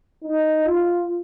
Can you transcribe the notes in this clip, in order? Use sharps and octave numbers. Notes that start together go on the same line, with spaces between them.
D#4
F4